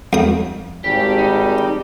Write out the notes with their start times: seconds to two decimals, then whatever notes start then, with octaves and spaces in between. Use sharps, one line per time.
0.13 F2 D#6
0.84 G#1 G3 G4
1.18 D#4